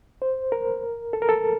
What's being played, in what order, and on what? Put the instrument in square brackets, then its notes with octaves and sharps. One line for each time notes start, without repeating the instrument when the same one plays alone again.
[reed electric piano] C5
A#4
A4
A#4
A4